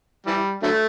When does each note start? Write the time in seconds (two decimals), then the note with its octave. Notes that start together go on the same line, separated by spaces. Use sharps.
0.27 E3 G3
0.63 D3 F#3 A3